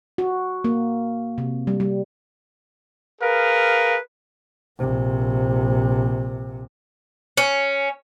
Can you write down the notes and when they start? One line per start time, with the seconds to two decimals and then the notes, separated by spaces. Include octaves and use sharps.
0.18 F#4
0.64 A#3
1.38 C3
1.67 G3
1.80 G3
3.21 G#4 A#4 B4 F5
4.78 A#1 C3
7.37 C#4